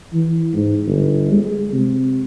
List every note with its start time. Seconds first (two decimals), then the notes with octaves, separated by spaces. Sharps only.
0.13 E3
0.54 G#2
0.86 G1
1.32 G#3
1.72 C3